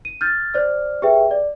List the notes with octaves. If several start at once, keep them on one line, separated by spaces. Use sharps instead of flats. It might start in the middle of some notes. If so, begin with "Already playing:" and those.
D#7
F6 G6 A6
C5 D5 F6
G4 G#4 B4 E5 G5
D5